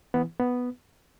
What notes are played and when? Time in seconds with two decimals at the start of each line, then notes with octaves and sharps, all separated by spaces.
0.14 E3 B3
0.40 B3